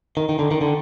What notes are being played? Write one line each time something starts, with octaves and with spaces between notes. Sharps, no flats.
D#3
D#3
D3
D#3
D3